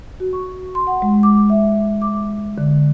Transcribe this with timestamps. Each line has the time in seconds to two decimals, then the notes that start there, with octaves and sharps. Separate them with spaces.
0.20 F#4
0.33 C#6
0.75 C6
0.87 F#5
1.02 G#3
1.23 D6
1.50 E5
2.02 D6
2.58 D3